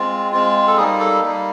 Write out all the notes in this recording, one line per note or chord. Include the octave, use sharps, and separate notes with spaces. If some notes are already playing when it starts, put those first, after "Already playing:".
Already playing: G#3 C4 F4
G#3 C4 F4
A4
G3 A#3 D#4 G#4
A4
G3 A#3 D#4